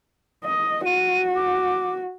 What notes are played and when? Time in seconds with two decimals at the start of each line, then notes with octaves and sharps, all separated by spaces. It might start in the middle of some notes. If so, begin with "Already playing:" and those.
0.44 D#5
0.85 F#4 D#7
1.36 D6